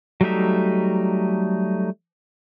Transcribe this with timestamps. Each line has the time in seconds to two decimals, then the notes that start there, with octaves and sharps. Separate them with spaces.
0.21 F#3 G3 A3 D#4 E5